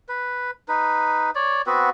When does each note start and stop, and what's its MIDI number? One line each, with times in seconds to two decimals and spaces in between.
0.09 0.51 71
0.68 1.30 63
0.68 1.30 71
1.35 1.62 73
1.35 1.62 74
1.67 1.90 59
1.67 1.90 60
1.67 1.90 66
1.67 1.90 71